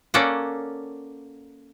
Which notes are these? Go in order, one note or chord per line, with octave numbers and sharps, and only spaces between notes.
A#3 C#4 A4 D5 F#5